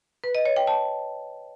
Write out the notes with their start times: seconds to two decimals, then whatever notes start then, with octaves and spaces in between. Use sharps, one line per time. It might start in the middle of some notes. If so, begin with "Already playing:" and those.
0.24 B4
0.35 D#5
0.46 C#5
0.56 G5
0.67 A5